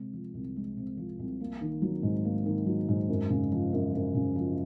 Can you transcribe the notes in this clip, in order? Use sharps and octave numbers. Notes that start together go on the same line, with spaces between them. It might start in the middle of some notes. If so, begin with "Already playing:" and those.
Already playing: C3 G#3
F3
C2
G#3
C3
F3
C2
A#3
D#3
F#3
G#2
A#3
D#3
F#3
G#2
F#2
C#3
F3
F#2
F#2
C#3
F3